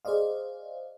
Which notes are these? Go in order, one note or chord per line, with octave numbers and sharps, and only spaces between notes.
G#4 C5 D5 D#5 F5